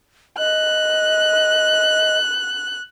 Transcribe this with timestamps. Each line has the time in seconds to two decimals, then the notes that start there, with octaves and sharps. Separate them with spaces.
0.38 D#5 F#6